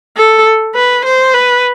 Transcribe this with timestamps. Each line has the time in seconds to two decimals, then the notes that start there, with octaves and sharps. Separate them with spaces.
0.17 A4
0.75 B4
1.05 C5
1.34 B4